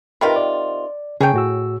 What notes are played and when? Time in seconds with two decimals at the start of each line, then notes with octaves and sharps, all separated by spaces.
0.21 C3 D#3 F4 A#4 B4 B5
0.36 D5
1.21 C#3 G#4 C#5 G5
1.34 A2 F#4 E6